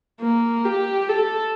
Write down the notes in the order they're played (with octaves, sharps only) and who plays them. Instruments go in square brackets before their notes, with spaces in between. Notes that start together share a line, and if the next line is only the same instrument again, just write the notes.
[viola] A#3
G4
A4